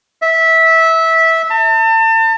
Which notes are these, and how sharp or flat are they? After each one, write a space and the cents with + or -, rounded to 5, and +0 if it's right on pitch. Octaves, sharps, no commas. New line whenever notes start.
E5 -15
A5 +35